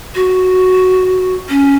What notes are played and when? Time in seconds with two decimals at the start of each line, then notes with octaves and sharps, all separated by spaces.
0.15 F#4
1.49 C#4